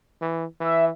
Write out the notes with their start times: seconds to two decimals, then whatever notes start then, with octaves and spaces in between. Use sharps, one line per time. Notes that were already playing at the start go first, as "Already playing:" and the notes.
0.21 E3
0.60 E3 E5